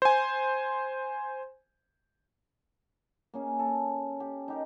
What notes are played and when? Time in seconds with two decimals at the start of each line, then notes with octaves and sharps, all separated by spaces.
0.02 C5 G#5
3.34 A#3 C#4 G#4
3.59 A4
4.20 G4
4.48 D#4 G4 A#4